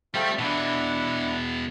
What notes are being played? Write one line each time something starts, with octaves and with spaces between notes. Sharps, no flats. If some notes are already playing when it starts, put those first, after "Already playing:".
G3 A3 C4 F4
B2 E3 D4 E4 F#5